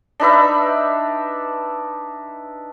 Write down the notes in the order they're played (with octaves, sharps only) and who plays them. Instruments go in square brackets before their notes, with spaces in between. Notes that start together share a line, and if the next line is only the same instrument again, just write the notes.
[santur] D4 D#4 B4 E5